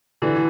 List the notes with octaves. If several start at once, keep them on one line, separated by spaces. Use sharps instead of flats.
D3 E3